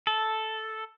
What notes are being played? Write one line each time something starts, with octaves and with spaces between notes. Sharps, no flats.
A4